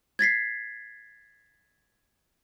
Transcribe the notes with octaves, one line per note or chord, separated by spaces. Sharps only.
G#6 A6 B6 C7